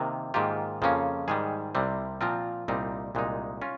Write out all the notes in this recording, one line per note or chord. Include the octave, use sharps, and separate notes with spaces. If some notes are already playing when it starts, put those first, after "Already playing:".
Already playing: C3 D#3 A#3
G#2 D#3 A#3 F4 G4
F2 C#3 F3 A#3 C#4
G#2 D#3 G3 G#4
C2 C3 G3 C4
A#2 F3 C4 F4 A#4
C2 A#2 G3 C4 D#4
C2 A#2 G#3 D#4
C#4 F4